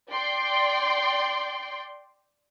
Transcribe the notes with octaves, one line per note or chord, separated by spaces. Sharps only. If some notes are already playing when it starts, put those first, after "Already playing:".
D5 G5 C6